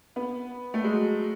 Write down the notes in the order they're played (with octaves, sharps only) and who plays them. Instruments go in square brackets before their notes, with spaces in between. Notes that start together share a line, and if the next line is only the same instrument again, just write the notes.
[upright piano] B3
A3
G#3
F#3